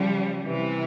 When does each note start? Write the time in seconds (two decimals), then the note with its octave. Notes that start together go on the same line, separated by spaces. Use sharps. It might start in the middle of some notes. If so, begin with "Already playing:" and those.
Already playing: C#3 F3 G3
0.46 C3 E3